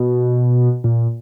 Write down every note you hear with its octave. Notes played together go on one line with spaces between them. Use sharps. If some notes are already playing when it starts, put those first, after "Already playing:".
Already playing: B2
A#2